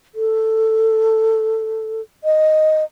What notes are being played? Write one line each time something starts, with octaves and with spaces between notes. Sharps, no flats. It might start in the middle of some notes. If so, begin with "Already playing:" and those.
A4
D#5